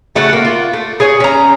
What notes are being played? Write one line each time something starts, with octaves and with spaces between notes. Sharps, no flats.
C#3 A3 F#4 F#5
A#3
F4
A3
G#4 C#5 G#5
C#4 A#5